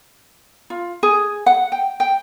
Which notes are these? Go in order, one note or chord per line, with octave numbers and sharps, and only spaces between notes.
F4
G#4
F#5
G5
G5